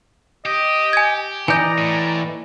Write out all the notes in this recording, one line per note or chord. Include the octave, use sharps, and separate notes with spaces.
G4 D#5
G#5 G#6
E3 D5 D#5 G#5 A#5 G6
A2